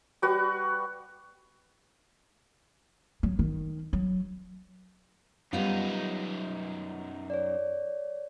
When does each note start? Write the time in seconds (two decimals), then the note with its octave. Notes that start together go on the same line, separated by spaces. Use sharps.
0.22 G3 F#4 B4
3.23 F#3
3.39 D#3
3.93 F#3
5.53 F#2 G3 B3 D#4 F4
7.30 C#5 D5